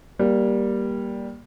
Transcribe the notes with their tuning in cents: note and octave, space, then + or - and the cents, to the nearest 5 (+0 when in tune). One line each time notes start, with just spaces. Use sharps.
G3 +0 A#3 +20